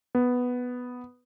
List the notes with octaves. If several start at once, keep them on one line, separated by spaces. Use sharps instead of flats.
B3